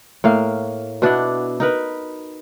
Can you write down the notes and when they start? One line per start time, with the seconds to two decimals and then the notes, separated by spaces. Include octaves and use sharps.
0.24 A2 A#3 F5
1.02 B2 D4 E4 F#5
1.60 D#4 A#4 B4